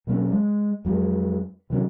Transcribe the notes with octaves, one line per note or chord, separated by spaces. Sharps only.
B2 F#3 A#3 C#4
G#3
F2 F#3 G#3
C3 D#3 F#3 C#4